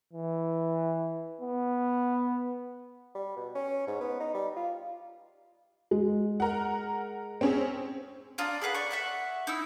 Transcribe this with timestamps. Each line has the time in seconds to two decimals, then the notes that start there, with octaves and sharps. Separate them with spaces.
0.13 E3
1.41 B3
3.15 G3
3.36 B2
3.55 C#4
3.87 G#2
4.01 B3
4.20 D#4
4.34 G3
4.56 F4
5.91 G#3
6.40 A#4 F#5
7.41 C4 C#4 G#4
8.38 D4 F4 A#5 D#6
8.62 G#4 A4 B4 F#5
8.75 D5 C#6
8.91 E5 F#5 C#6
9.47 D#4 E4 E6